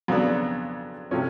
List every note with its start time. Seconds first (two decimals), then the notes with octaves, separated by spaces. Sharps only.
0.08 F2 C#3 F#3 B3 D4
1.11 C3 F3 A3 C#4